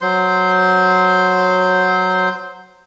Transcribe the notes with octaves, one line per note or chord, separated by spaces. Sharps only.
F#3 C5 C6